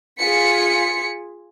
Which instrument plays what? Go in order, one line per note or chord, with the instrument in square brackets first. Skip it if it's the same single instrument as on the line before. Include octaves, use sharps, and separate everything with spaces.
[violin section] F4 G#4 B6 C#7